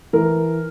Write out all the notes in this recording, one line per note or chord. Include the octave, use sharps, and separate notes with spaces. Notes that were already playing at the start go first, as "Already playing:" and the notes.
E3 A#4